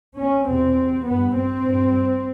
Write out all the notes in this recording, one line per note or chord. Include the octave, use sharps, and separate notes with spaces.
C#4
E2 C3 C4
G2 B3
C4
G2